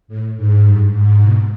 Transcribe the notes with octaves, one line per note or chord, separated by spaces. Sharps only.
A2
G#2
G2
G#2
B2